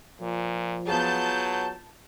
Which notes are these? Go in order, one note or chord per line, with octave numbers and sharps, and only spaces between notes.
A#2 F3
F#3 B3 F4 G#4 A5 G6